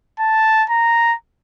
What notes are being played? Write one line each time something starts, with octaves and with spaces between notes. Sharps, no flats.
A5
A#5